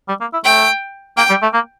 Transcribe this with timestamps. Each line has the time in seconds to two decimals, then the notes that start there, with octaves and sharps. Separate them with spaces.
0.08 G3
0.21 A#3
0.33 E4
0.45 A3 G5
1.17 A#3 G5
1.30 G3
1.42 A3
1.54 A#3